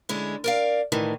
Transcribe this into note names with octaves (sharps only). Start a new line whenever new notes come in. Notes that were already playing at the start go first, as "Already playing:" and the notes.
D3 G#3 C#4 E4
A#4 D5 F5
D2 A2 D#3 E3